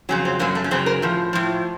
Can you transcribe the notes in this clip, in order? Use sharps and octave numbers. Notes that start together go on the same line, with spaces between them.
F2 C#3 F#3 C#4
C4
F#2 C#3 F#3 A#3
A3
C#4
F#2 C#3 F#3 C4
A#4
A2 F3
A2 F3